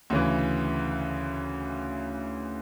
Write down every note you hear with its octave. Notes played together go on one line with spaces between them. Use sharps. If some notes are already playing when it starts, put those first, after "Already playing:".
D2 C#3 E3